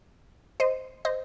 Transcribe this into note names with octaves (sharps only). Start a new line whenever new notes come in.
C5 D#5
C5 D#5